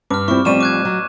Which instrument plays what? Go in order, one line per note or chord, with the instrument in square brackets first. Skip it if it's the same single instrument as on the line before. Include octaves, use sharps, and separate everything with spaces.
[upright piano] G2 [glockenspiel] D6 F6
[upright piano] F3 G3 [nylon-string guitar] C4 E4 [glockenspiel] C#6
[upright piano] A1 D5 C#6 [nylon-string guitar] F3 G3 C4 [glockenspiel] D#7 E7
[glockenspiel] D6 F#6 G#6
[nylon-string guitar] F#3